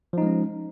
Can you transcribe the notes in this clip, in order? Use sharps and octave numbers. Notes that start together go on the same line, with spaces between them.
F3 G#3 C#4 D#4